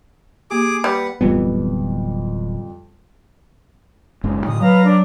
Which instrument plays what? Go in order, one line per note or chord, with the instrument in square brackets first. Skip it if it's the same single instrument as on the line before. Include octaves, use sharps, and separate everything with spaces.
[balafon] A#3 G4 [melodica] G#4 D6
[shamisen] G3 [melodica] B4 F#5
[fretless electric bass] D1 E3 B3 [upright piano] F2 G3
[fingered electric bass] F#1 G#2 C#4
[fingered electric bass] A2 D3 [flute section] D#6
[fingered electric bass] F#3 [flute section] B4 F5 A#5
[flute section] D4